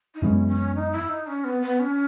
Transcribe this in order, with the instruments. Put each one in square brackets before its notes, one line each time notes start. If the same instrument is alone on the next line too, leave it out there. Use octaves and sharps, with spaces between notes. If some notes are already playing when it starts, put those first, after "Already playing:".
[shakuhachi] D#4
[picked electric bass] F#2 E3 G#3 B3 [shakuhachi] C#4
[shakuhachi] C#4
D#4
E4
D#4
C#4
B3
B3
C#4